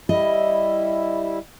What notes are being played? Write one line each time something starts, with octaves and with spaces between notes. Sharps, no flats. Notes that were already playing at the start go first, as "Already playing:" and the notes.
G3 E4 D#5